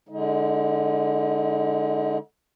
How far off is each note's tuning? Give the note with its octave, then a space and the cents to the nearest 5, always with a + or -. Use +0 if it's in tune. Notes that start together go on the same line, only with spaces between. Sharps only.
D3 +0 G#3 +0 D#4 +40